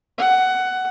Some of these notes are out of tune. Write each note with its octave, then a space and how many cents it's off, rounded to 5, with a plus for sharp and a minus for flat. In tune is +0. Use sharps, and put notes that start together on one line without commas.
F#5 +15